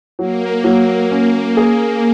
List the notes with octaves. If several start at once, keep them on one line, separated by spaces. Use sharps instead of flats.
F#3 A#3
F#3
C#4
G#4